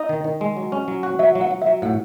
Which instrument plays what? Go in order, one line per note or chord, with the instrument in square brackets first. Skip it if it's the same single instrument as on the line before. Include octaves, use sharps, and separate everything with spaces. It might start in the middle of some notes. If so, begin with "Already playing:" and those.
Already playing: [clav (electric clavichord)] D#4 [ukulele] D#5
[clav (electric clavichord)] D#3
D#3
G#3
F#3
C#4
F#3
F#4
[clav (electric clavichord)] F#3 [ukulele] E5
[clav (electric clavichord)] F#3
[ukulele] F#5
[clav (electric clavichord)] F#3
[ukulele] E5
[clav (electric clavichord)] F#3
[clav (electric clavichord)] A2 [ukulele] F#5